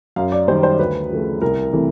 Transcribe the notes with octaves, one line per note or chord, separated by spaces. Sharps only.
F#2 F5
D5
D#3 G3 C5
C5
D2 B4
C#3 F3 A3
C2 A#4
C3 E3 A3